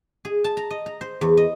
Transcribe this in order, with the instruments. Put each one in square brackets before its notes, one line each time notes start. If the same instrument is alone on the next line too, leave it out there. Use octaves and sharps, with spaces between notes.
[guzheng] G#4
A5
A#5
D#5
A#5
C5
E2
D#5